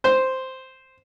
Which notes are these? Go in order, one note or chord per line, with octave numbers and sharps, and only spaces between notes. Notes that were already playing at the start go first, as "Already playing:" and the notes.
C5